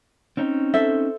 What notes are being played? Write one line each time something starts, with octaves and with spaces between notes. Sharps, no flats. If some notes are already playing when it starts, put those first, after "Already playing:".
C4 C#4 D#4
A4 C5 E5